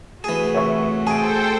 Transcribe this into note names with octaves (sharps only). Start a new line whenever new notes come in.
C3 E3 A3 F#4 G#4
C#5 E5 C#6
G#4 A4 C5 G5 G#5 D7